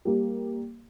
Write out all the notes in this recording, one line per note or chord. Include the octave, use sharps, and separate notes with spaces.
G3 A#3